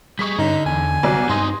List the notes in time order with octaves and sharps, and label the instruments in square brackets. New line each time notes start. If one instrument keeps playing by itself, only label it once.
[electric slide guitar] G3 G#4 [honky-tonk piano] C#6 D#6 B6
[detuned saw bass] G2 [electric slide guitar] D3 [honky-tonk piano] C#4 [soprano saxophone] D#4
[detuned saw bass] E2 [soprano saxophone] G#5
[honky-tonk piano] C2 F#3 D5 [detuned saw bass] B3
[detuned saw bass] G2 [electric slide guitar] C4 D#4 [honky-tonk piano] C6 D#6 A#6